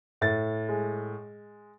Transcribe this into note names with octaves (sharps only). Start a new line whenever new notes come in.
A2 A6
G#3